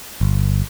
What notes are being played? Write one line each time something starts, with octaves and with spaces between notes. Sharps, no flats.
G1